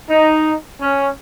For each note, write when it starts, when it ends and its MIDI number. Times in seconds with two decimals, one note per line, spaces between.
0.10 0.53 63
0.81 1.08 61